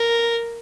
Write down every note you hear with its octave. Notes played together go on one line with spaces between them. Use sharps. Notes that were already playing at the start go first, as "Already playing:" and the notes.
Already playing: A#4